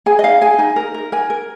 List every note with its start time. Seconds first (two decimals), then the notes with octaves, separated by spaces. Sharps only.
0.06 G#4 G#5
0.19 D#5
0.24 D#4 F5
0.41 G#4 G#5
0.58 D#4 G#5
0.76 A#4
0.94 A#4
1.12 A#4 G#5
1.30 A#4